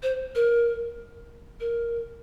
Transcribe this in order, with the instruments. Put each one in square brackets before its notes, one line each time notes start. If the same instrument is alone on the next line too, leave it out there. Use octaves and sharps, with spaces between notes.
[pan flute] C5
A#4
A#4